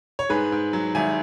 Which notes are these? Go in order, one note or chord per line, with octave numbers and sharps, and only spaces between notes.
C#5
G#2 G#4 B4
G#2
F#3
G#1 E5 G#5